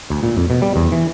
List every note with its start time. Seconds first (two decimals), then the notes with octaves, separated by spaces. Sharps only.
0.10 D2
0.23 A#2
0.37 F2
0.50 B2
0.62 G3
0.76 E2
0.92 E3